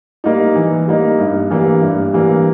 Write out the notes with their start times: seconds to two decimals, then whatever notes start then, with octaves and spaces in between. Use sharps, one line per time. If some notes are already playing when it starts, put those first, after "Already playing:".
0.24 G3 A#3 D#4
0.56 E3
0.87 G3 A#3 D#4
1.19 G2
1.50 E3 G3 A#3
1.82 G2
2.14 E3 G3 A#3